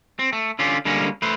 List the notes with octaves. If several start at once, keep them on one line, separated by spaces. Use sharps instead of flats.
C4
A3
D3 C#4 F4 G4
D3 G3 G#3 A#3 C#4
A3 B4 C5